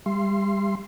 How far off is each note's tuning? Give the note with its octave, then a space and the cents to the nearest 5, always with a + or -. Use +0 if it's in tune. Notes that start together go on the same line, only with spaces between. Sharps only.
G3 +25 E5 +45 C6 +0